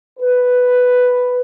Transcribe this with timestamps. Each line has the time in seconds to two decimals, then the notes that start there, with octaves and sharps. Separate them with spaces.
0.19 B4